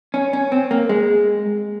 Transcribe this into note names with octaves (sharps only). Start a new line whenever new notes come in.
C#4
C#4
C4
A#3
G#3